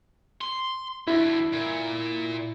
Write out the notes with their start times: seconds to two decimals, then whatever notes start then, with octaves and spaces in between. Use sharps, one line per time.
0.41 C6
1.07 D2 E4
1.53 A#2